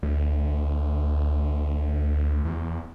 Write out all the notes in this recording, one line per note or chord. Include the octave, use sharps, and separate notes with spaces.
D2
E2